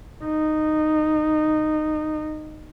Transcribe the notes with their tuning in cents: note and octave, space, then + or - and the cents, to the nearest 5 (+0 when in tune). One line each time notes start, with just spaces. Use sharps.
D#4 -15